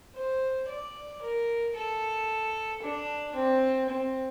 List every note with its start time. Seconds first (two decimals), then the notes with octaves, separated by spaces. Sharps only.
0.15 C5
0.68 D5
1.22 A#4
1.75 A4
2.83 D4
3.35 C4
3.89 C4